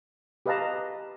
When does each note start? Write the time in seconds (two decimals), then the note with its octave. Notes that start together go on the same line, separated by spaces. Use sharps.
0.46 G4 B4 D#5 F5 A5 A#5